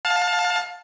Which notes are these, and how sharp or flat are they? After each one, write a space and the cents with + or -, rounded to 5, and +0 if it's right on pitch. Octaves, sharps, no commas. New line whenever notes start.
F5 +30 A5 +5